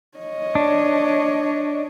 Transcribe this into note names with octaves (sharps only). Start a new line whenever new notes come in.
C#5 D#5
D4